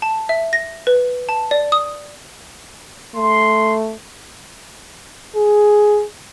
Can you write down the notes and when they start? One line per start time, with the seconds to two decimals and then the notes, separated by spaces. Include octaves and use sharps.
0.02 A5
0.29 E5
0.53 A#6
0.87 B4
1.29 A5
1.51 D5
1.72 D#6
3.15 A3 C6
5.36 G#4